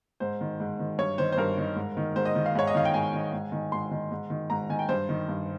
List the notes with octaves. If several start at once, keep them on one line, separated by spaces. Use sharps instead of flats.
G#2 C5
D#3
G#2
D#3
G2 C#5
D#3 C5
C5
G2 A#4
D#3
G#2
D#3
G#2 C5
D#5
D#3
F5
G#2 C#5
D#5
D#3 F5
G5
G#2 G#5
D#3
G#2
D#3
G#2 C6
D#3
G#2
D#3
G#2 A#5
D#3 G#5
G5
G2 C5
D#3
G2